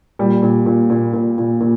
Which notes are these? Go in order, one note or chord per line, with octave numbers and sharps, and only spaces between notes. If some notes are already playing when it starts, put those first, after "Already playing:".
A#2 G3
A#2
A#2
A#2
A#2
A#2
A#2